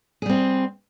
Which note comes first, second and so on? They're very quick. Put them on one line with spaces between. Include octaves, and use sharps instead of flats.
G#4 G3 C4